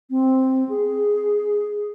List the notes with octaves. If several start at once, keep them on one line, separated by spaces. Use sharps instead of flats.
C4
G#4